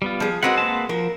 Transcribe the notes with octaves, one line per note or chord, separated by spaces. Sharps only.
G3 B3 F4
F3 G#4
G#3 C4 F#4 A#4 B4 F#5
A#3 B4 A5
F3 A#4